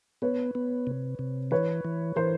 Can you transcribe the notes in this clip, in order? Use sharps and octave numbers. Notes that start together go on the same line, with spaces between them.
B3 B4 C#5
B3
C3
C3
E3 B4 C#5
E3
E3 A#4 C5